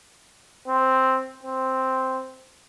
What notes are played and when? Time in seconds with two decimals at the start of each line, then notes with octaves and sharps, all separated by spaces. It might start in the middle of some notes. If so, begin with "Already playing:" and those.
0.68 C4
1.43 C4